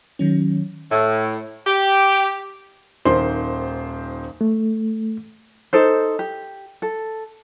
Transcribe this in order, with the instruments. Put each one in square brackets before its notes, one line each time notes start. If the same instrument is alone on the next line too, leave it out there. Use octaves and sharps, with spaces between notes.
[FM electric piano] D#3 F#3 C#4
[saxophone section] A2
G4
[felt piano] D#1 D#3 C5 C6
[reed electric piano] A3
[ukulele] D#4 A4 C5
G4
A4